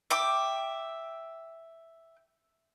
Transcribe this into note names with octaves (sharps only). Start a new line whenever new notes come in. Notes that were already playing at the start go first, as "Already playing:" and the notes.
E5 G5 D6